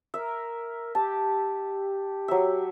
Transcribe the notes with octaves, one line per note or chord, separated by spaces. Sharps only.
A#4 E5
G4 A5
F#3 E5